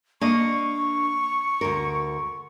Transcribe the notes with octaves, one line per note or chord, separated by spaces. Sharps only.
A#3 D4 D#5 C#6
D2 G2 A#4